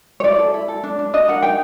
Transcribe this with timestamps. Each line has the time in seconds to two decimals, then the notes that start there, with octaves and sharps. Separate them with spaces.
0.20 C#5
0.23 E4 D5
0.39 A4
0.54 E4
0.68 A4
0.84 D4
0.99 D4
1.14 D4 D#5
1.28 A#4 F#5
1.42 D#4 G5